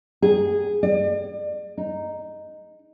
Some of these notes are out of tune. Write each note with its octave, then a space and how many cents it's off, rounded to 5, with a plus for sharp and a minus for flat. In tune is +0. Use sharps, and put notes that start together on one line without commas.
G#4 -10
D5 +40
D#4 -5